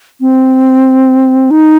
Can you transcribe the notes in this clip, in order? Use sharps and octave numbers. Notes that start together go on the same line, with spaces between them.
C4
D#4